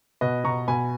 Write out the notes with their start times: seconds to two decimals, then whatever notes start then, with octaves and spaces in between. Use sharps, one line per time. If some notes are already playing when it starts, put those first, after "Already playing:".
0.21 B2 B4 D#5
0.44 B2 A#5 C#6
0.68 B2 G#5 B5